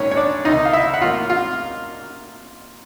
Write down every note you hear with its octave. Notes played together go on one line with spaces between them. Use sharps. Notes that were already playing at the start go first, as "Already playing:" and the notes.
Already playing: A#1 G#2 D#3 C#4 C#5
C#5
D4 D5
C#2 C3 D#3 D#4 D#5
F5
E4 E5
F#5
A2 F#3 A#3 F4 F5
F4 F5